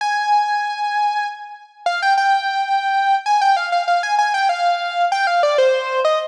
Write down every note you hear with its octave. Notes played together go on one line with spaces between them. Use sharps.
G#5
F5
G5
G5
G#5
G5
F5
F5
F5
G#5
G#5
G5
F5
G5
F5
D5
C5
D#5